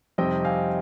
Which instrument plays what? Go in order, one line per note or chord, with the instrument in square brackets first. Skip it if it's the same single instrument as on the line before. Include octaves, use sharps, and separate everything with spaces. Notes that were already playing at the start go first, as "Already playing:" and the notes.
[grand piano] F2 C3 G3 C4 D#4 D#5 G5
F5 G#5